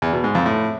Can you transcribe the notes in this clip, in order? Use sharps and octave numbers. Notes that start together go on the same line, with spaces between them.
E2
B2
G#2
F2
A2